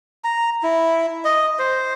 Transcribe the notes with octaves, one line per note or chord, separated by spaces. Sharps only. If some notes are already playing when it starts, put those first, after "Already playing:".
A#5
E4
D#5
C5